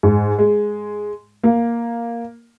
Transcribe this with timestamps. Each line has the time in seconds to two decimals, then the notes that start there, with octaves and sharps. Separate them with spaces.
0.03 G#2
0.39 G#3
1.44 A#3